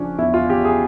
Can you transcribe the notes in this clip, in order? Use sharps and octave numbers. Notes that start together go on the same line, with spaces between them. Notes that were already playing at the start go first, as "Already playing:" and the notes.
Already playing: C#3 F3 C#4 D4
E2 E4
F4
E2 G4
G#4